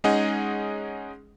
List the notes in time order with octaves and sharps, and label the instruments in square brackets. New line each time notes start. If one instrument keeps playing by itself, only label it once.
[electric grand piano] G#3 C#4 D#4 G#4 D#5 F#5